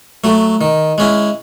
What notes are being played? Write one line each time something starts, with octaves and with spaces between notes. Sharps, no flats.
F#3 A3
D#3
G#3 C#4 E4